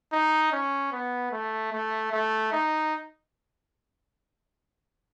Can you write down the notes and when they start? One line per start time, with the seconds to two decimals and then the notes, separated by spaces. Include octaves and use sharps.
0.13 D#4
0.52 C#4
0.92 B3
1.32 A3
1.72 A3
2.12 A3
2.52 D#4